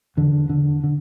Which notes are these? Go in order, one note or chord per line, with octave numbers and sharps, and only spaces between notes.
E2 D3
D3
D3